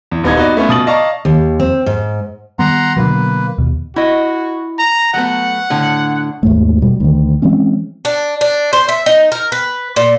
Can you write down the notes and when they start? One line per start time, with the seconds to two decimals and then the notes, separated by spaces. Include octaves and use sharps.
0.11 E2
0.24 D#1 B3 D#4 G#6
0.36 B3 D#4 F#4 B4 D5
0.57 A3 B3 C#4 F4
0.69 B2 D#6 A6 F#7
0.87 D5 D#5 F5 A5 A#5 C#6
1.25 D#2
1.60 C4
1.86 G#2
2.59 D#3 G3 B3 F#5 A#5 C6
2.97 B2 D3 F#3 A#3 B4
3.58 D#2 B2
3.96 E4 F#4 D#5
4.79 A#5
5.14 F#3 A3 B3 F#5
5.70 A2 D3
6.43 D#2 G#2 A3
6.82 B2 G3
7.00 D2 D#3
7.42 E3 G#3 C4 C#4
8.05 D4
8.41 D4
8.73 C5
8.89 E5
9.06 D#4
9.32 A#4
9.52 B4
9.96 A#2